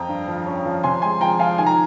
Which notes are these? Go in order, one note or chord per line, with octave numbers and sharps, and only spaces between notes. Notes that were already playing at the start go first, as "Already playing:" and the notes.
Already playing: F2 G5 A#5
G2
F3
C#4
F3
C3 G#5 C6
G#3 G#5 C6
F3 G5 A#5
F3 F5 G#5
D#3 G#5
A#5